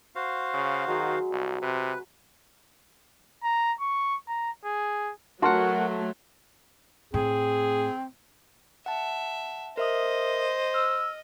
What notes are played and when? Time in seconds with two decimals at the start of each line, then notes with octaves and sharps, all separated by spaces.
0.15 F#4 C5 F5
0.54 C#3
0.88 D#3 F#3 G#3 G#4
1.32 C2
1.62 C3 B4
3.44 A#5
3.81 C#6
4.28 A#5
4.65 G#4
5.42 F#3 A3 F#4 A#4 F#5 A5 C6
7.14 A2 C4 G#4
8.86 E5 F#5 A5
9.77 A#4 C5 D#5 E5 D#6
10.74 E6 F6